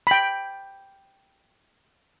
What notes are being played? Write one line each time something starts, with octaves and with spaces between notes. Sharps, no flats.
G5 B5